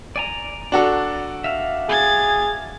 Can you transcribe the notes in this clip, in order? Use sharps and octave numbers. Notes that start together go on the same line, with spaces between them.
D5 G#5 A#5
D4 F#4 A4
E5 F5
G#4 G#6 A6